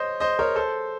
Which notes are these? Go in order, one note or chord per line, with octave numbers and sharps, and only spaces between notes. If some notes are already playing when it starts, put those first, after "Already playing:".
Already playing: C5 C#5 D#5
C5 D#5
A#4 C#5
A4 C5